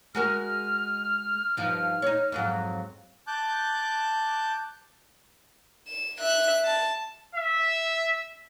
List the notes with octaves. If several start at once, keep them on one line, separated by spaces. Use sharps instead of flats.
G#3 F#4 A#4 F6
G2 F3 D#4
D#4 C#5
F2 G#2 F#3
A5 D6 F#6 G6
E7
E5 F#6
A5
E5